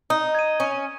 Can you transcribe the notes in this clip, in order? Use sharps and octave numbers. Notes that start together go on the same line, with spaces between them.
D#4 D#6
G#6 D#7
C#4 D#6